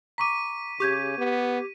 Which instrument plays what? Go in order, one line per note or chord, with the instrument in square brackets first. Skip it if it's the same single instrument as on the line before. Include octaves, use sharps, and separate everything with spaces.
[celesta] A#5 C#6 D6 [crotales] B6 D#7
[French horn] C#3 [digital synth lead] G4 [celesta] C#6 G6 G#6
[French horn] B3